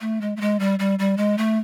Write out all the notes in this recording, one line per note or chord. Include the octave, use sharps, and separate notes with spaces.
A3
G#3
A3
G#3
G3
G3
G3
G#3
A3